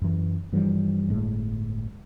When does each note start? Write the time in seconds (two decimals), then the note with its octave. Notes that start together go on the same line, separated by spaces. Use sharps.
0.02 F#2 E3
0.53 G2 E3 F3 G3
1.09 G1 A2 G#3